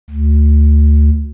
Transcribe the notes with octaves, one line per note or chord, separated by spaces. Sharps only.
D2